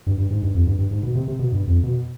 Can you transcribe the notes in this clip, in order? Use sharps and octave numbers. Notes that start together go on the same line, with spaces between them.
G2
G2
G#2
G2
F2
G2
G2
G#2
B2
C3
C3
B2
G2
F2
B2